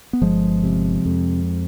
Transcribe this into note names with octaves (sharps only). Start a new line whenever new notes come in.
B3
G1 F3 G#3
C3
F2